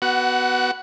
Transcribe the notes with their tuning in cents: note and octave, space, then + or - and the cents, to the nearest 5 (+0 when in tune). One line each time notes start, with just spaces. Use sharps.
B3 +0 F#4 +25 F#5 +0